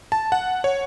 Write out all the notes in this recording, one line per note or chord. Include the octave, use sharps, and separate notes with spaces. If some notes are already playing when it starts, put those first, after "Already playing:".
A5
F#5
C#5